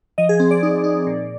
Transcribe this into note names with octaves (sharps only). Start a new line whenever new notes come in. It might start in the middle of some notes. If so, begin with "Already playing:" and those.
F3 D#5
G#4
C4
D5
D#4
D#4
A#2